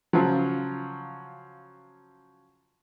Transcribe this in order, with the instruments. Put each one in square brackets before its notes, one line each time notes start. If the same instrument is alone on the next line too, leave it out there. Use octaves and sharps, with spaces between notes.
[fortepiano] C#3 F3 F#3